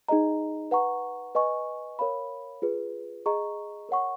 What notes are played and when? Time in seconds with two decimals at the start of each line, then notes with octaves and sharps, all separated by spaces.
0.08 D#4 G#4 D#5 A#5
0.71 B4 F#5 A#5 C#6
1.35 B4 D#5 G#5 C#6
1.99 A#4 C#5 F5 B5
2.62 F4 G#4 B4
3.26 G#4 D#5 A#5 C#6
3.89 A#4 C#5 F#5 C#6